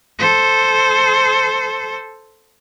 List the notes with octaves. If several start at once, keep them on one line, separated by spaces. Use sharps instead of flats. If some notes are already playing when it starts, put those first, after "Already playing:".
A4 C5